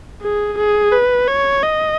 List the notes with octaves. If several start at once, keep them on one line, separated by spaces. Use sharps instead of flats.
G#4
G#4
B4
C#5
D#5